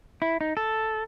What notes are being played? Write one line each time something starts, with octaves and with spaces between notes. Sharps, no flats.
E4
D#4
A4